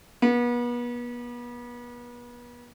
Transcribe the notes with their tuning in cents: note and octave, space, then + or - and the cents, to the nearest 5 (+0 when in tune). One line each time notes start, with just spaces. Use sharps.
B3 -35